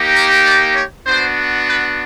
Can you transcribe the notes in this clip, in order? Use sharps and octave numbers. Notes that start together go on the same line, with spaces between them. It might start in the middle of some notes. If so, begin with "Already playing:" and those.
Already playing: A#3 D#4 G4
A#4
D5
C#5
B3 D4 F#4 C5
B4